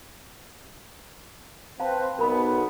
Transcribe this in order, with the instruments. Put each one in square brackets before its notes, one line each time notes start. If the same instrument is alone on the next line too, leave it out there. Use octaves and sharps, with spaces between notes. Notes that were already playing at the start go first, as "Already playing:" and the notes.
[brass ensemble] C4 B4 [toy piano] F5 A5
[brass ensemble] B1 B3 [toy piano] A#4 B5